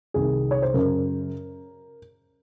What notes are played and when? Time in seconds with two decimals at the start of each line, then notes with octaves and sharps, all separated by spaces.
0.14 C2 C3 D#3 G#4
0.51 C#5
0.62 C5
0.74 F#2 C#3 A#4